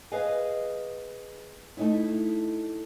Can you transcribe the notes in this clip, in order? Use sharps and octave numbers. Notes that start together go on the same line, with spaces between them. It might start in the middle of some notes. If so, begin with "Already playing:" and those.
G#4 B4 C5 D#5 F5 G#5
A3 D#4 E4